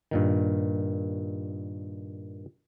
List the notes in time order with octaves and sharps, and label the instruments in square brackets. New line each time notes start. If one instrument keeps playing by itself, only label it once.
[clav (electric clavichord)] G2 A#2 D#3